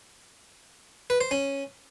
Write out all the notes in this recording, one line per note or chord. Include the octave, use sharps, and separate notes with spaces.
B4
C5
C#4